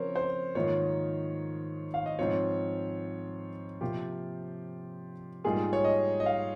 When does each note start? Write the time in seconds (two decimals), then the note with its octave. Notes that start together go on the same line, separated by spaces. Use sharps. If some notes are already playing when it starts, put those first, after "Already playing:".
Already playing: C#3 F3 C4 A#4 C5 C#5
0.16 C5
0.55 G#2 D#3 A#3 F4 C#5
1.94 F5
2.06 D#5
2.19 G#2 F3 C4 F4 C#5
3.81 C3 F3 A#3 F4 G4
5.44 G#2 G3 A#3 F4 G#4
5.73 C#5
5.84 D#5
6.20 D#5
6.26 F5